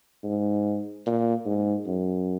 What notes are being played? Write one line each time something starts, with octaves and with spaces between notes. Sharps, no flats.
G#2
A#2
G#2
F#2